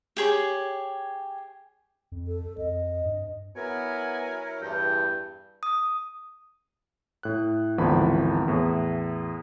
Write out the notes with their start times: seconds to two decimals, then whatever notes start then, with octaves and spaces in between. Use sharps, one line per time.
0.17 G4 G#4 C#5
2.12 F2
2.27 A4
2.58 F2 D#5
3.05 G2
3.56 F#3 B3 E4 A#4 G#5
4.62 E2 G2 G5
5.63 D#6
7.23 A2 F#6
7.78 G#1 D2 E3 F3 B3 B5
8.48 E2 A2